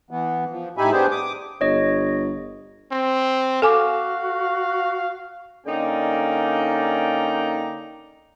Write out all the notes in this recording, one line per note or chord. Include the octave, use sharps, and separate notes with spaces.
E3 B3
F3
A2 D#4 G4 E5 G#5 B5
B3 D4 G4 G#4 C5
D6 D#6
G1 C#5 D#5
C4
F#4 A4 F5 G#5 D6
D3 A#3 C#4 D#4 D5 G5